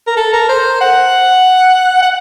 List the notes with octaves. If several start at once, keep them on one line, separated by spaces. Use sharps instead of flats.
A#4
A4
A#4
C5
F#5
F#5